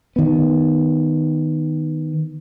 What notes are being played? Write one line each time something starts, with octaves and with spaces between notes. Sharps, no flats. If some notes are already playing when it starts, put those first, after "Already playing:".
D#3 B3